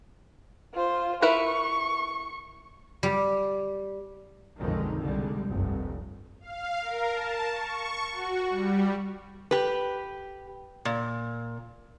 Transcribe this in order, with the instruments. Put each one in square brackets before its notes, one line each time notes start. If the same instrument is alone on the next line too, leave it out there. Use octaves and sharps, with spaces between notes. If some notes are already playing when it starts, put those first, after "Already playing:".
[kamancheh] F4 C5
[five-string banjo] E4 A#4 B4 [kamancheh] C#6
[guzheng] G3
[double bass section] B1 F2 D3 D#3 F3 G#3
C2 D3 G3 G#3
F1 C2 G2
[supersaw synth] F5
A#4
A5
C#6
F#4
G3
[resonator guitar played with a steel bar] G4 B4
A#2